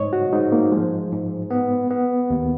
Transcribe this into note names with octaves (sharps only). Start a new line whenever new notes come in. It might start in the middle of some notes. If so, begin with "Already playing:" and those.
Already playing: G#2 C#5 D#5
F#4
G#2 D#4
A#3
F3 G#3
G#2
B3
B3
D#2